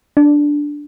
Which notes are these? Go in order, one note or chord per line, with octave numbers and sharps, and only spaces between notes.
D4